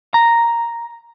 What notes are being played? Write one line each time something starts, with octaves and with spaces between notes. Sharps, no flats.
A#5